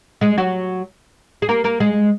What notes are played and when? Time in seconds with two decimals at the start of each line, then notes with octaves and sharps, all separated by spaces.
0.21 G#3 G#4
0.38 F#3 F#4
1.42 G#4
1.49 A#3 A#4
1.64 A#3 A#4
1.80 G#3 G#4